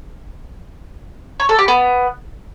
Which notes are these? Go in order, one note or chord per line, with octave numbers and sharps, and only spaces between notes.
C#5
A4
G4
B3